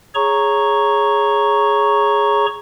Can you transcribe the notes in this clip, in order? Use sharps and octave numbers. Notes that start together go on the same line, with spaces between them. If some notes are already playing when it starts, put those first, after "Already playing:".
G#4 C#5 A#5 C#6